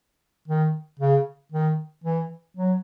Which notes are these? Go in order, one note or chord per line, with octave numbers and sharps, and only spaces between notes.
D#3
C#3
D#3
E3
F#3